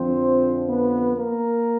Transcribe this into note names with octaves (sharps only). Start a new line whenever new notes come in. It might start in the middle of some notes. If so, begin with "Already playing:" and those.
Already playing: F2 D3 F3 C4 C5
B3 B4
A#3 A#4